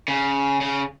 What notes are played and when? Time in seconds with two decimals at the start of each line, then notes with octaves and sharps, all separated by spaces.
0.08 C#3
0.61 C#3